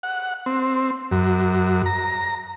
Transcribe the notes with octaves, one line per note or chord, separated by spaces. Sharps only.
F#5
C4
F#2
A#5